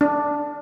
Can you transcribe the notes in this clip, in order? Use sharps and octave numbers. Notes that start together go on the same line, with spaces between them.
D4